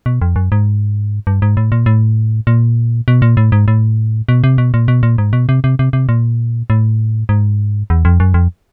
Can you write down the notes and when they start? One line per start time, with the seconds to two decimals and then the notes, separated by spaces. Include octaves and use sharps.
0.06 B2
0.22 F2
0.36 F#2
0.52 G#2
1.27 G2
1.42 G#2
1.57 A2
1.72 A#2
1.86 A2
2.47 A#2
3.08 B2
3.22 A#2
3.37 A2
3.52 G#2
3.68 A2
4.29 B2
4.44 C3
4.58 B2
4.74 A#2
4.88 B2
5.03 A#2
5.18 G#2
5.33 B2
5.49 C3
5.64 C3
5.79 C3
5.93 C3
6.09 A#2
6.70 A2
7.29 G#2
7.90 E2
8.05 F2
8.20 F#2
8.34 F2